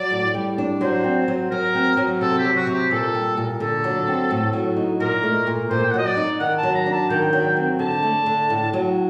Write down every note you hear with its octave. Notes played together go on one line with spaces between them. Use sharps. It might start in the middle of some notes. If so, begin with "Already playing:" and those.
Already playing: F#3 D5
A2
G3
D4
F#3 C5
C4
F#3
F#3 A#4
C4
F#3
C3 A4
G4
F#3
F#4
C3
G4
A#2 A4
G3
A#2
D3 A4
F#3
C4
A2
F#3
D#4
A#2 A#4
A3
A#2
A#2 C5
G5
F#5
F#3 D#5
D5
D#4
D#3 F#5
A5
F#3
A#5
D4
A5
D#3 G5
F#3
C4
D3 A5
A3
D3
A2
F#3